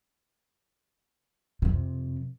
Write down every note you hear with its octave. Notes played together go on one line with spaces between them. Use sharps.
F2 C3